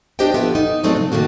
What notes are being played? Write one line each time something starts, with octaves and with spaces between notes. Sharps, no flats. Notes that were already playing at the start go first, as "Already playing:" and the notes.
D4 G4 C5 D#5 G5
F3 B3 A4 E5
D#4
F#3 G#3 A3 C4 D4 D#4
C#3
C3 D#3 A3 A#3 F#4